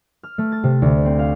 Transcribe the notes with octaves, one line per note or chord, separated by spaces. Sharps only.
F6
A3
A6
C3
D2
C4
F5